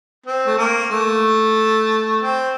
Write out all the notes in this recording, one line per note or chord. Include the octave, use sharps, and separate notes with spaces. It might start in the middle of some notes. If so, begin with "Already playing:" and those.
C4
A3
A#3
A3
C4